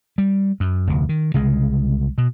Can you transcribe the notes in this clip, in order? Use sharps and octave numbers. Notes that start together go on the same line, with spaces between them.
G3
F#2
F1 D2
D#3
C2 C#3 G#3
B2